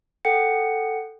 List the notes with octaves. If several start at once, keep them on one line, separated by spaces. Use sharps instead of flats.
A4 F#5 G5 C#7